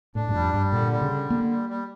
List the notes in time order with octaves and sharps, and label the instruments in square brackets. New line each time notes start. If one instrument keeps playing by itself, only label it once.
[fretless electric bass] A2 [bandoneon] D4
[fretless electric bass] G2
[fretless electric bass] F2 [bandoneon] G3
[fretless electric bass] G2 [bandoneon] G3
[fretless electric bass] A#2 [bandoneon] D3
[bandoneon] G3
[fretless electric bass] C#3
[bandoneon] D3
[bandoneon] D3 [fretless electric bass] A#3
[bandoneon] G3
G3